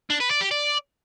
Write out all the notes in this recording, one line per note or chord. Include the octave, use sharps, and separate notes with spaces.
D4
B4
D5
G4
D5